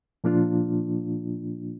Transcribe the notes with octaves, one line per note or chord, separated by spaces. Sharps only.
A#2 F3 A#3 D4 F4